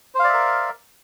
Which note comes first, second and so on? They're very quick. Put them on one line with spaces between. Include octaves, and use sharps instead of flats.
C5 F5 D5 E5 A#4